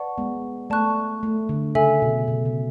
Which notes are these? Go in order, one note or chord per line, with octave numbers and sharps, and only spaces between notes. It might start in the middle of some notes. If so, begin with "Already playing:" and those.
Already playing: B4 D5 F#5 A5 C#6
G#3 B3
A3 D5 A5 C#6 F#6
A3
D3
C#3 A4 E5 G#5
B2
B2
C#3